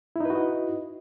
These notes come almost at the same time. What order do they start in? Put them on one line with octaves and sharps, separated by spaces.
E4 D#4 B4 F#4 D#5